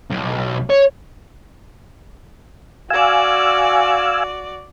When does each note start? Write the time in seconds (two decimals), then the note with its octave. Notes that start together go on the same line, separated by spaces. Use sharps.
0.10 B1
0.70 C#5
2.90 F#4 D5 F5 G#5 E6